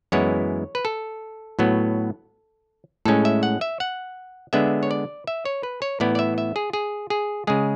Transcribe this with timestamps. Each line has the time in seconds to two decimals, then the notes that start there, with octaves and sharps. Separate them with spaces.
0.12 F#2 E3 G#3 B3 E4 C#5
0.75 B4
0.85 A4
1.59 A2 F#3 B3
3.05 A2 G#3 C#4 A4
3.25 E5
3.43 F#5
3.61 E5
3.80 F#5
4.53 D3 G#3 B3 D4 E5
4.83 C#5
4.91 D5
5.27 E5
5.45 C#5
5.63 B4
5.82 C#5
6.00 A2 E3 B3 E4 D5
6.15 D5
6.19 E5
6.38 E5
6.56 G#4
6.73 G#4
7.10 G#4
7.47 C#3 G#3 G#4